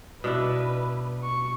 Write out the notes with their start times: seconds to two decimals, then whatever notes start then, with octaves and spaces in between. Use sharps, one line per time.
0.24 B2 D4 E4 B4
1.23 C#6